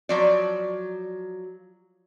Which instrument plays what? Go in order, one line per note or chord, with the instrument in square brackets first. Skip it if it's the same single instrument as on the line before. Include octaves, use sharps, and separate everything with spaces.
[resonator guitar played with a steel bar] F3 F#3 D5